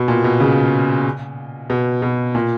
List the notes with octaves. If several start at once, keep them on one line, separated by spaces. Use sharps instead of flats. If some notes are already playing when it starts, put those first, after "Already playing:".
Already playing: B2
A#2
B2
C#3
B2
B2
A#2